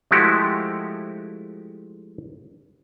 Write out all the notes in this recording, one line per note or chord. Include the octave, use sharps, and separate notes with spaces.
F3 G#3 A3 E4 F#4 G4